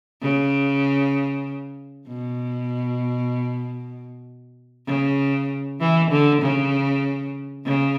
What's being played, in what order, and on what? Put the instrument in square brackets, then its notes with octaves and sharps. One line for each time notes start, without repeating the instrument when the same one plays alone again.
[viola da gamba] C#3
B2
C#3
E3
D3
C#3
C#3